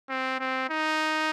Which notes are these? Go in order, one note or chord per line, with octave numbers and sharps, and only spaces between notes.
C4
C4
D#4